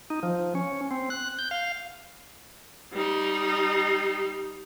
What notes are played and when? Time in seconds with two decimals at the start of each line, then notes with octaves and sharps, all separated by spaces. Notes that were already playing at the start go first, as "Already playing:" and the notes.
0.10 D#4
0.23 F3
0.55 C#4
0.91 C4
1.10 F#6
1.39 G6
1.51 F5
2.93 G3 D#4